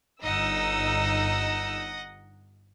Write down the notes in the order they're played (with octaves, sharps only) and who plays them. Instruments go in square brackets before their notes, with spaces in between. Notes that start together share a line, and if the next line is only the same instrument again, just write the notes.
[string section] G1 D#4 E6 [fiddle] D#5 F#5